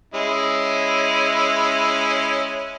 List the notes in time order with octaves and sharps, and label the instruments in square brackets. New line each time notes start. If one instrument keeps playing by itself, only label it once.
[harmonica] G#3 C#4 E4